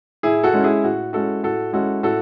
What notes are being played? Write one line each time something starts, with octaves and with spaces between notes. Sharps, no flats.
A2 E4 G#4
F#4 A4
G#3 C#4 E4
E4 G#4
A2 F#4
G#3 C#4 E4 F#4 A4
A2 F#4 A4
G#3 C#4 E4 F#4 A4
A2 F#4 A4